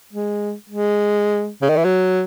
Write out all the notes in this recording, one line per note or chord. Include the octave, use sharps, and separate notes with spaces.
G#3
G#3
C#3
D#3
E3
F#3